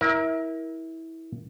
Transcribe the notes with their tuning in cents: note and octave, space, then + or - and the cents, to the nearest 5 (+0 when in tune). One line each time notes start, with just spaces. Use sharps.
E4 -20 A#4 +25